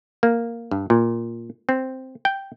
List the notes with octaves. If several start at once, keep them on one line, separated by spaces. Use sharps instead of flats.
A#3
G2
A#2
C4
G5